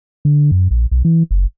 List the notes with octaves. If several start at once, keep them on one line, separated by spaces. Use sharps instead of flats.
D3
F#2
A#1
B1
E3
F#1